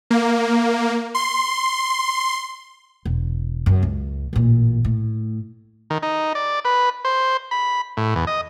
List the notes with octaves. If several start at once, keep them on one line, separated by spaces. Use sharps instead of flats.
A#3
C6
E1
F#2 C#3
C#2
A1 A#2
A2
D#3
D#4
D5
B4
C5
B5
A2
E2
D#5